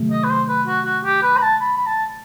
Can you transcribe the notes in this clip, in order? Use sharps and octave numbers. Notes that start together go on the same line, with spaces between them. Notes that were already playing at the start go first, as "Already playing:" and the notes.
Already playing: C3 D#3 F#3 A3
D#5
B4
C5
B4
F#4
F#4
G4
B4
B5
A5
B5
B5
A5